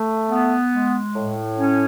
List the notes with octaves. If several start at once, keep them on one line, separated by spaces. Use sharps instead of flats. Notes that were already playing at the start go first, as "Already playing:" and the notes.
Already playing: A3
B3
G#3
A2
C#4